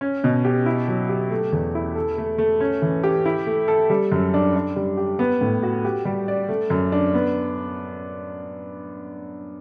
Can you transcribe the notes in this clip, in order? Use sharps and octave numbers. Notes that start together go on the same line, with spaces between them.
C#4
B2
G4
E4
F#3
G4
A3
E2
E4
A4
A3
A3
C#4
E3
G4
E4
A3
A4
G3
F#2
D4
D4
G3
G4
B3
A2
F#4
G4
G3
D5
A3
F#2
D4
B3